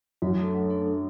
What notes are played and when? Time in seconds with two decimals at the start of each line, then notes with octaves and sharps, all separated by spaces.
0.22 F#2 F#3
0.38 A3 D4 A4
0.54 F#3
0.70 A3 D4 A4
0.86 D4